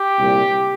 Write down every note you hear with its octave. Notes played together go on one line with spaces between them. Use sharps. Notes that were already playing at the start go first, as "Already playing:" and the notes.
Already playing: G4
C2 A#2